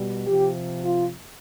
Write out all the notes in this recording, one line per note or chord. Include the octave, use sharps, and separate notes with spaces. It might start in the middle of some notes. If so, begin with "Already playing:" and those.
Already playing: B2 G3
C3 F3 G4
F4